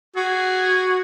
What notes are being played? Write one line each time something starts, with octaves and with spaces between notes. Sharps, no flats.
F#4 G#4